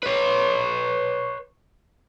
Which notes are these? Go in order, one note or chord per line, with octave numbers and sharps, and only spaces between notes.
B4 C#5